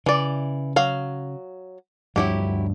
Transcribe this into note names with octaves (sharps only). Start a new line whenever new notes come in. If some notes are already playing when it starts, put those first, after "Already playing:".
C#3 E3 D5
F#3 F5
D2 G2 F3 F#3 E4 G4